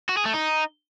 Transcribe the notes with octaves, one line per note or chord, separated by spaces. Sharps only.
F#4
G#4
A3
D#4